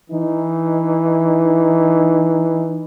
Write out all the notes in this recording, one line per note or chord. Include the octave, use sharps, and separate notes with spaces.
E3 D#4